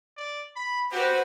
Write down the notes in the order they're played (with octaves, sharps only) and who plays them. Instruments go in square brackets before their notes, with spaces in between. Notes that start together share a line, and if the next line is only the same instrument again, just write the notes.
[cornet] D5
B5
[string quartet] F#4 B4 [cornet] G4 [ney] C5